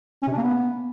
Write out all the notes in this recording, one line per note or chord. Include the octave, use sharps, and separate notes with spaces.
C#4
C3
D4
A#3
B3